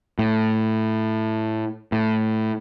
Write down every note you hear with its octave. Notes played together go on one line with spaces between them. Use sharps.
A2
A2